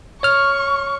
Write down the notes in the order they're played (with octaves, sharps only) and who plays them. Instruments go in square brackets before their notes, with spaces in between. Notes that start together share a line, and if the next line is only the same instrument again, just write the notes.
[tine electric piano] C#5 F6 [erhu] C#6